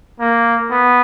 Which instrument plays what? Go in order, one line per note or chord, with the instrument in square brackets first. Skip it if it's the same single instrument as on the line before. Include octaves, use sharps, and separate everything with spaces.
[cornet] A#3
B3